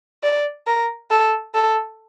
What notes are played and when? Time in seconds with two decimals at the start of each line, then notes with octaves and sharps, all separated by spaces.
0.23 D5
0.67 A#4
1.11 A4
1.55 A4